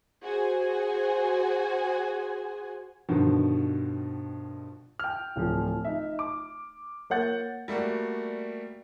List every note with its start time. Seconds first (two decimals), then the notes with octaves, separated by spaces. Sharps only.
0.23 F#4 G#4 C5 G#5
3.09 G2 B2 D3 D#3 F3
4.99 G5 F6
5.36 D1 F3
5.85 D#4 E5
6.19 D6
7.10 A#3 C#5 F#5 G6 A6
7.68 G3 A3 A#3 F#4